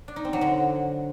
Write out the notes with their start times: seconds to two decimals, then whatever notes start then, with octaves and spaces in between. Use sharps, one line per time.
0.08 D4
0.16 D#4
0.25 C4
0.33 F#3
0.41 D3